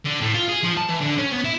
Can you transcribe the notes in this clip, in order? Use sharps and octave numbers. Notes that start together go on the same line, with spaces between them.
D3
A2
F4
G#4
F3
A5
E3
D3
C#4
B3
E4